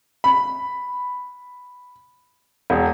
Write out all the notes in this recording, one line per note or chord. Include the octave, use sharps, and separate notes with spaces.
B5
E1